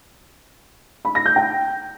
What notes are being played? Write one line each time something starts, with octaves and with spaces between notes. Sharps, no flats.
B5
A#6
G6
G5